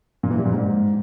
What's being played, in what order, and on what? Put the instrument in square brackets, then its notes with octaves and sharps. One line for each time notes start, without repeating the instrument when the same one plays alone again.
[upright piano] A#2
E3
G3
A#2
G#2